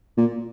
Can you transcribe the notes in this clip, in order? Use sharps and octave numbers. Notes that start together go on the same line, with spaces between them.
A#2